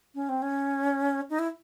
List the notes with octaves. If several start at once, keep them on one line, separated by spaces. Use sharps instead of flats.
C#4
C4
C#4
D#4
E4